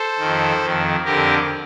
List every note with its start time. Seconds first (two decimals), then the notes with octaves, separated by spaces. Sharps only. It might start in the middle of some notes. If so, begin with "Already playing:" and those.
Already playing: A4 C5
0.19 F2 D#3
0.62 F2 D#3
1.04 F2 D3 G4 A#4